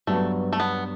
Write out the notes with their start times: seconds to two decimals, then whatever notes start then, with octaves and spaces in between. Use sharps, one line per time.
0.07 G2 F#3 A3 B3
0.53 A3
0.60 B3